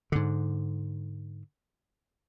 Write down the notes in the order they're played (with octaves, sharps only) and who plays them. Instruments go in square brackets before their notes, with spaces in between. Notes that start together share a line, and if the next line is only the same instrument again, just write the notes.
[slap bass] G#2 D3